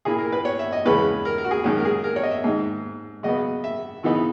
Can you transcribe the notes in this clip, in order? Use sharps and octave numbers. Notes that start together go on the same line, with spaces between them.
A#2 A#3 E4 G#4
A#4
B4
C#5
E5
D#5
E2 C#3 G#3 C#4 E4 B4
A#4
A#4
F#4
G#4
F#2 D#3 G#3 C#4
A#4
G#4
A#4
C#5
D#5
E5
G#2 D#3 G#3 D#4
C#3 F#3 B3 D#5
E5
C#3 E3 B3 D#4